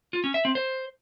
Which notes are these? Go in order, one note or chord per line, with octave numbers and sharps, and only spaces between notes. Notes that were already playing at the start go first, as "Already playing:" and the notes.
F4
C#4
E5
C4
C5